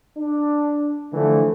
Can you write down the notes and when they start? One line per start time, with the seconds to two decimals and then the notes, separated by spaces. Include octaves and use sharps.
0.17 D4
1.13 D3 E3 F3 A3